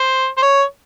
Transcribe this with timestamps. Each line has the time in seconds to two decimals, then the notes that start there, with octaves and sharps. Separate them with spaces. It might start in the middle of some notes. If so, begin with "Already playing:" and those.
Already playing: C5
0.38 C5
0.43 C#5